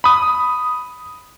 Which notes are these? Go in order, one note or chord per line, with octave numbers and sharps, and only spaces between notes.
B5 D#6